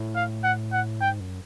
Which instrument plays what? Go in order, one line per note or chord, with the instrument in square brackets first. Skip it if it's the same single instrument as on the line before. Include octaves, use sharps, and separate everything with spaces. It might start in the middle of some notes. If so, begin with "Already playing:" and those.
Already playing: [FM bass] A2
[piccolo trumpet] F5
F#5
F#5
[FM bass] G#2 [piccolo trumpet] G5
[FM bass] F#2